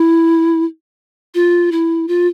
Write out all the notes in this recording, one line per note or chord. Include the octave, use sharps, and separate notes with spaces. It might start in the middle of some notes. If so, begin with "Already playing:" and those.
Already playing: E4
F4
E4
F4